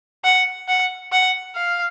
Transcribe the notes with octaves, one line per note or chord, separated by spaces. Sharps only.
F#5
F#5
F#5
F5